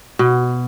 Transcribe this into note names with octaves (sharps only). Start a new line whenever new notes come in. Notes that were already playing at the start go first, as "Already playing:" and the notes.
B2